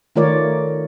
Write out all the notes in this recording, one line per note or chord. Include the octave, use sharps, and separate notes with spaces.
D#3 A3 F4 A#4 C#5 D5